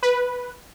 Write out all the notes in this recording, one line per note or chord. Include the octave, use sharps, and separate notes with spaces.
B4